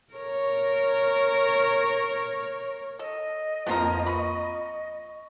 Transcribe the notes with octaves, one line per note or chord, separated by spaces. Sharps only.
A#4 C#5
A4 D#5
F2 F3 A#3 B3 F4 A#4
B5 C#6